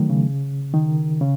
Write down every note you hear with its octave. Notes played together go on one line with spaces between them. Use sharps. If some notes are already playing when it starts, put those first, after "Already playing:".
Already playing: D#3 F#3 A3
C#3
D#3
C#3